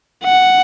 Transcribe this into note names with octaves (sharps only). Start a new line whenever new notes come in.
F#5